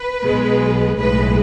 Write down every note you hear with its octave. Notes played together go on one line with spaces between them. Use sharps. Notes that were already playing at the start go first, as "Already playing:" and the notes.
Already playing: B4
B1 B2 G#3
B1 A2 G#3 B4